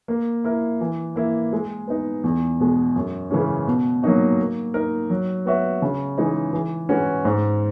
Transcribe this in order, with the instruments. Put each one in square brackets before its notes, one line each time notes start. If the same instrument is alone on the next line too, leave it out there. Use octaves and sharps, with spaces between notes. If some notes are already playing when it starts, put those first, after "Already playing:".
[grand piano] A#3
E4 A#4
E3
A#3 E4
G#3
B3 D#4
E2
B2 G#3
F#2
C#3 E3 G#3 C#4
B2
F#3 A#3 D#4 F#4
A#3
D#4 A#4
F#3
B3 F#4 C#5 E5
C#3
E3 G#3 D#4
E3
G#3 C#4 F#4 B4
G#2